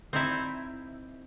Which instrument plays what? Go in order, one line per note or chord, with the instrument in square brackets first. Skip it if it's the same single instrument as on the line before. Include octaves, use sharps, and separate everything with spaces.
[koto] C4 D#4 E4